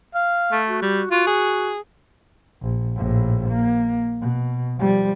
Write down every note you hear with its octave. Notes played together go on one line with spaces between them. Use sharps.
F5
A3
F#4
G3
F4 F#4
G#4
A#1
A#1 A2
A#3
B2
F3 G3